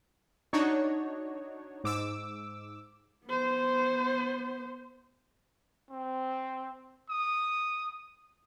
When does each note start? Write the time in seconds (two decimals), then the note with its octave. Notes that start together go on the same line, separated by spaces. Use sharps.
0.53 D4 D#4 F#4 C#5
1.84 G#2 D6 E6
3.26 B3 C5
5.90 C4
7.10 D#6